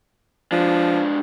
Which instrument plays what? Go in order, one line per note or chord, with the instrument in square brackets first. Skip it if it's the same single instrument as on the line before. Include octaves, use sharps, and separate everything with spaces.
[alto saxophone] F3 [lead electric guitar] G#3 D4